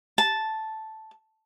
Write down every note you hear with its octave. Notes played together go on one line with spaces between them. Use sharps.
A5